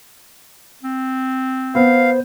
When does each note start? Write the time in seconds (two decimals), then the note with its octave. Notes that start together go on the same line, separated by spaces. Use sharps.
0.83 C4
1.75 B3 C5 F5